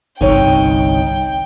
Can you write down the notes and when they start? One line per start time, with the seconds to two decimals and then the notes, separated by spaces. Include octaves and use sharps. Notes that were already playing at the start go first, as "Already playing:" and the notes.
0.21 G1 C2 D#4 C#5 G5